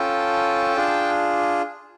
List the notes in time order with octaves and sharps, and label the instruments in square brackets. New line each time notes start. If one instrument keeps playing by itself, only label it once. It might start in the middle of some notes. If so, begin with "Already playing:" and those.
Already playing: [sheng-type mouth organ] C#4 F4 A4 G5 A5
D4 F4 G#4